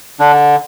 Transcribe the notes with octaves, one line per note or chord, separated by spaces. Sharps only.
D3 D4